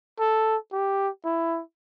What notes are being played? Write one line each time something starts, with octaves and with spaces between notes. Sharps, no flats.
A4
G4
E4